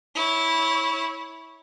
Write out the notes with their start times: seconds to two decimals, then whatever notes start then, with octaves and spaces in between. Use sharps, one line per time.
0.15 E4 C#5